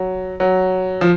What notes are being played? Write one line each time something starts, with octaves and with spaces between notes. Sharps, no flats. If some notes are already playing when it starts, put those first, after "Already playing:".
Already playing: F#3
F#3
F3